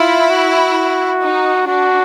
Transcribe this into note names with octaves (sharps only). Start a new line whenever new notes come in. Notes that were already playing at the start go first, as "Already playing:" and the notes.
Already playing: E4 F4
F#4
D#4
D4 F#4